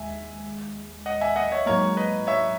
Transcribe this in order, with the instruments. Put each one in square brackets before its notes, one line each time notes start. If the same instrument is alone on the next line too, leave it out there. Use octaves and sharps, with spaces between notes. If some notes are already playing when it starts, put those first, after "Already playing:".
Already playing: [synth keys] D#2 G#3 [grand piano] E5 G#5
[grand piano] D#5 F#5
E5 G#5
D#5 F#5
C#5 E5
[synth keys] G#2 F#3 A#3 [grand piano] A#4 C#5
[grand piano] B4 D#5
C#5 E5